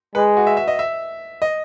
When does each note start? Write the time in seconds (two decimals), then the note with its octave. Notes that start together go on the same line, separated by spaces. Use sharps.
0.15 G#3 B4
0.37 F#4
0.47 E5
0.57 E5
0.68 D#5
0.79 E5
1.42 D#5